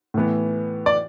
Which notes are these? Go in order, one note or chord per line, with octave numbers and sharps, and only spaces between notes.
A2 E3 B3
D5